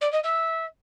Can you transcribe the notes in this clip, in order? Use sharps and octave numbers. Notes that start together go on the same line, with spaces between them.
D5
D#5
E5